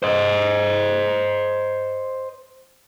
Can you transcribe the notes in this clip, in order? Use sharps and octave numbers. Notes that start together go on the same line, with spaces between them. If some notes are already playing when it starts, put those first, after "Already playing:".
C5 D#5